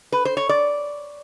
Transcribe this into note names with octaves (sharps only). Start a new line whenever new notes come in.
B4
C5
C#5
D5